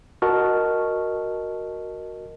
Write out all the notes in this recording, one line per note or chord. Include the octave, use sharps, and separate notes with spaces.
F#4 A#4 D#5 A5 C#6 F6